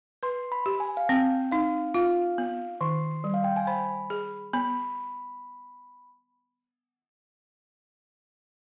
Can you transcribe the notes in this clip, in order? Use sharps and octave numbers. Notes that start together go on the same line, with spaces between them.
B4 C6
B5
G4
G#5
F5
C4 G5
D#4 F5
F4 F5
B3
D#3 C6
G3
F5
G5
G#5
C5 B5
G#4
B3 B5